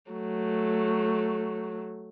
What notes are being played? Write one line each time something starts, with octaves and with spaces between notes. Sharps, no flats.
F#3 A3